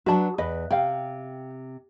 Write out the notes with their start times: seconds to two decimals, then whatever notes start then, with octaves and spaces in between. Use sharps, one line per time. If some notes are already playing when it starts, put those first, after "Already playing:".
0.06 F#3 D4 F#4 B4 A5
0.38 E2 B4 D#5
0.71 C3 F5 G5